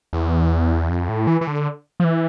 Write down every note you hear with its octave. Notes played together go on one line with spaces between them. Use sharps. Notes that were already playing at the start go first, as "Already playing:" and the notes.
E2
F2
A2
E3
E3
D3
F3
E3